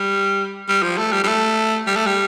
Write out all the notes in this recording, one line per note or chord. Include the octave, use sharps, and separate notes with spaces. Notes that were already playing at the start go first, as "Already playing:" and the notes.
Already playing: G3
G3
F3
A3
G3
G3
A3
G3
A3
G3